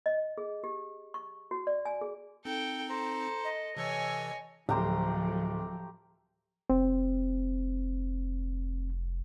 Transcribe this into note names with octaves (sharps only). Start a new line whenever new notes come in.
D#5
G#4
G4
C#6
F#4
D5
G#5
G#4
C4 D#4 A4 G5
A4 C5 A#5
D#5
C3 E3 A4 C#5 G#5 E6
D1 F3 F#3 A3 G4 C5 A#5
F1 C4